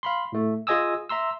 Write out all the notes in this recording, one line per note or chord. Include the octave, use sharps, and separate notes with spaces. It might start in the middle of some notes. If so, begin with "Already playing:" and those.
F5 B5 C6
A2 A3
F4 G#4 D#5 G#5 D#6 E6
E5 A#5 C6 E6